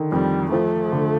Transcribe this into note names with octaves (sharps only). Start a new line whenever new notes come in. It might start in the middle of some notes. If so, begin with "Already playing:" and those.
Already playing: D3 D#3
F2 G3
F3 A3
D3